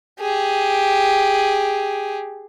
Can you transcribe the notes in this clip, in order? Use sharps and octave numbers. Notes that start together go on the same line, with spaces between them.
G4 G#4